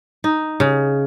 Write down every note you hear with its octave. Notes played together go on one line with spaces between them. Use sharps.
D#4
C#3